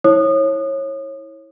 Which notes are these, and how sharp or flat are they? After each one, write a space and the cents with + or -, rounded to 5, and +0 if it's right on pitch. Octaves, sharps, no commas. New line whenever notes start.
E4 -20 C#5 -20 D#6 -30